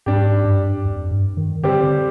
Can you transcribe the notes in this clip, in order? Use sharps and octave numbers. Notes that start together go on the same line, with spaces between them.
G#2 G3 D4 G4
G2
F2
G2
D#3
D3 G3 C4 G4
D3